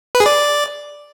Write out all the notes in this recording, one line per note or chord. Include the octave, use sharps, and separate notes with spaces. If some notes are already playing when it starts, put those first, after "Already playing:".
B4
G#4
D5